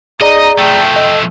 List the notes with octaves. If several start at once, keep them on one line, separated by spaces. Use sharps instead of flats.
D#4 G#4 D5 D#5 A#5
F3 A3 G5
D#5